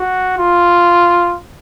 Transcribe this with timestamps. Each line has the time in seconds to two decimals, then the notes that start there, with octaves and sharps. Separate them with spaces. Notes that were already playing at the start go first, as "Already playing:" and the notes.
Already playing: F#4
0.38 F4